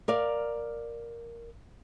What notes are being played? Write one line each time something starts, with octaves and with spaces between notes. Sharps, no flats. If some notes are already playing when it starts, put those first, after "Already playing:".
A#4 D5 F5